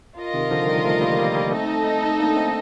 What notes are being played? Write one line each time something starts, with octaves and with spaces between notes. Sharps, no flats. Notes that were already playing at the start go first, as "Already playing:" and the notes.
F4 A#4 D#5
C3 D#3
D3 F3
D#3 G3
F3 A3
G3 A#3
G3 A#3
G3 A#3
A3 C4 D#4 A4 D#5
A#3 D4
A3 C4